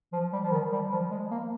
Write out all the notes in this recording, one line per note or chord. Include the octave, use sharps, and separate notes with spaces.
F3
G3
F3
D#3
G3
F3
G#3
A#3